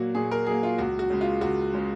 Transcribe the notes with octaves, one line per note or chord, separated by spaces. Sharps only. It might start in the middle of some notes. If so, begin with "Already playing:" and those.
Already playing: A#2 F#3 A#3 F#4
A#2 G#4
A#4
F#3 A#3 G#4
F4
C#2 F#4
F#4
C#3 G#3
F4
C#2 F#4
C#3 G#3